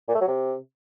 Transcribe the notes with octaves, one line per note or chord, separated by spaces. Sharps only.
A#2
A3
F#3
C3